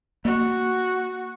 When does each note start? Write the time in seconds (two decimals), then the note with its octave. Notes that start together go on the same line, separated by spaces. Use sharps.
0.25 A#3 F#4